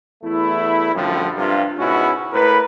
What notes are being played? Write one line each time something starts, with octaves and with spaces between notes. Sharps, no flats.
E2 A3 E4
F#2 A2 D3 F3 G3
G2 C3 F4
G#2 B2 C#4 E4 F#4
A2 A#4 B4